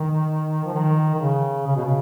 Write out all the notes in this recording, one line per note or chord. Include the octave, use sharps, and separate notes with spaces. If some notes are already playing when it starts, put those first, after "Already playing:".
Already playing: D#3
F3
D#3
D#3
C#3
C#3
B2
C#3